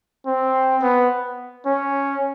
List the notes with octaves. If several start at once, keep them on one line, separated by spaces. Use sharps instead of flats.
C4
B3
C#4